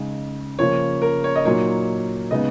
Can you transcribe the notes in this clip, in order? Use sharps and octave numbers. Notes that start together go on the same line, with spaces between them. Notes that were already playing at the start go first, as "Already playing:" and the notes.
Already playing: C#3 G#3 D#4
C#3 F3 A#3 C#5
A#4
C#5
D#5
A#2 F#3 A#3 D#4 C#5
C#3 G#3 B3 D#4 D#5